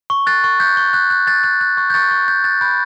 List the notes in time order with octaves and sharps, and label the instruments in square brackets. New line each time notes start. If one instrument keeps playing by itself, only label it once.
[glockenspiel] C#6
F#6 A6
C#6
F#6 G6
C#6
F#6
F#6
F#6 A6
F#6
F#6
C#6
G6
C#6 A6
C#6
C#6 G6
F#6 A6
B5 G6